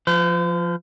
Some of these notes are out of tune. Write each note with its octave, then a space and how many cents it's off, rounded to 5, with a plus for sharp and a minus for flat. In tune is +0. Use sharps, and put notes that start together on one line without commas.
F3 +0 C5 -45